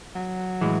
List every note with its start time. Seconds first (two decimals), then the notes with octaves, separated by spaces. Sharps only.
0.15 F#3
0.61 A2 E3 G#3